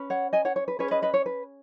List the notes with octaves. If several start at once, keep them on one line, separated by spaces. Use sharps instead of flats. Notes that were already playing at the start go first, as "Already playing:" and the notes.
Already playing: C#4 B4
C#5 F#5
D#5 G#5
C#5 F#5
C#5
B4
C#4 G#4 B4 C#5
B4 D#5
B4 D#5
C#5
B4